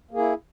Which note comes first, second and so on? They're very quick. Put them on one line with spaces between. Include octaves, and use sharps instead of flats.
A#3 G#4 E4